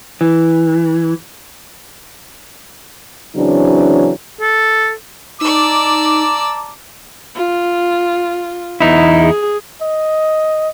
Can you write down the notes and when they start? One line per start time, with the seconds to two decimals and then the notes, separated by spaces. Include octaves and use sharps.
0.21 E3
3.36 C#3 E3 F#3 C4 D4
4.41 A4
5.41 D#4 D5 A5 A#5 D6 E6
7.35 F4
8.80 E2 B3 D#4 E4
9.20 G#4
9.82 D#5